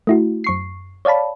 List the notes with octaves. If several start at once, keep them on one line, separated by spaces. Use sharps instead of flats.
A3 E4 F#4
F#2 C#6 C7
C#5 D5 F5 A5 B5